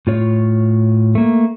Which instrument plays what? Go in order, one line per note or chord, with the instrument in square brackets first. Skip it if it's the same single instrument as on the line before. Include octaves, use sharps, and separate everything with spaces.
[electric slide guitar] A2 F4 C#5
A3 A#3